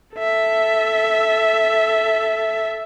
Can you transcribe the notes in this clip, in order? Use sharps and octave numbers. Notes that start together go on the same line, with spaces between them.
A4 E5